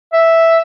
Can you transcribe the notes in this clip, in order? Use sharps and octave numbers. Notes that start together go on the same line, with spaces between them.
E5